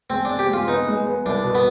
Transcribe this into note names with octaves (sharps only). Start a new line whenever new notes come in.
G#3 C4
C4 D4
G4
G#3
F4
B3 D#4
G#3
B3
C2 D4
B2
B3